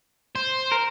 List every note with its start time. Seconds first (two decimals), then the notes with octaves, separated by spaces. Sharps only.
0.36 C5
0.72 A#4